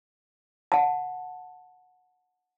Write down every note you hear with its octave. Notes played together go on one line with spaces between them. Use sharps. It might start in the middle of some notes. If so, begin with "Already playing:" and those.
F#5 A5